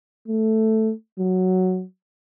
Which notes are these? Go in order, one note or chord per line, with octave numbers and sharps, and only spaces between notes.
A3
F#3